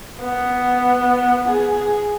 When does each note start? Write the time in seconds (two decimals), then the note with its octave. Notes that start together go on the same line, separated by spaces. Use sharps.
0.21 B3
1.48 G#4